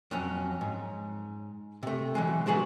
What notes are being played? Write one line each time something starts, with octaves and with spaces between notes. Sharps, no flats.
F2 F#3 C#4
G#2
C3 A3
E3 F#3 G#3
D3 F3 F#3 G#4 B4